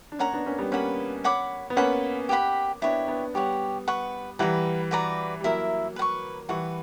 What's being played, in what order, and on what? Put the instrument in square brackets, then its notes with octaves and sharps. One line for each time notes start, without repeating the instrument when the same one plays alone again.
[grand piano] D4
[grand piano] A#3 C#4 [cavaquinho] C#5 F#5 A#5
[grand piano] B3 D4
A#3 C#4
G3 B3
[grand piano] A#3 C#4 [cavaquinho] B4 F#5 B5
[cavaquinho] C#5 F#5 B5 D6
[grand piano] B3
[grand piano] A#3 C#4 [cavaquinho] B4 F#5 B5
[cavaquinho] G4 B4 F#5 B5
[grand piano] B3 D4 [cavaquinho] E4 G4 C#5
[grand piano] B3 D4
[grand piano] G3 B3 [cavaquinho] G4 C#5 F#5
[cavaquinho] B4 F#5 C#6
[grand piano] E3 G3 [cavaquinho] B4 F#5 A#5
[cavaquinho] F#4 B4 D5 A#5
[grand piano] G3
[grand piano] F#3 A#3 [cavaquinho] E4 A#4 E5
[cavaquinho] B4 F#5
C#6
[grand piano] E3 G3 [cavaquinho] B4 F#5 C#6